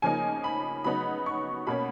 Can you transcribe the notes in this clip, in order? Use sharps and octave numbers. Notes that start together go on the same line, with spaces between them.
C#3 F3 A#3 D#4 G#5
B5
C#3 F#3 B3 D#4 B5
C#6
B2 A#3 C#4 B5